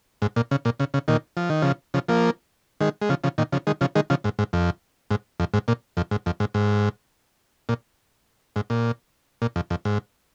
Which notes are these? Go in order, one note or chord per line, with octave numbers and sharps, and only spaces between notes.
G#2
A#2
C#3
A#2
C#3
C#3
A#2 D#3
F3
D#3
C#3 F3
C#3 F3
F3 A#3
D#3 G#3
G#3
C#3 F3
C#3 F3
A#2 D#3
C#3 F3
D#3 G#3
C#3 F3
D#3 G#3
C#3 F3
G#2
G#2
F2
G#2
F2
G#2
A#2
F2
G#2
F2
G#2
G#2
A#2
G#2
A#2
A#2
F2
F2
G#2